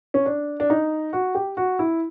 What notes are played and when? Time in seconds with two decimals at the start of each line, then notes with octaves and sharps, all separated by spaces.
0.14 C#4
0.26 D4
0.60 D4
0.70 D#4
1.13 F#4
1.35 G4
1.57 F#4
1.79 E4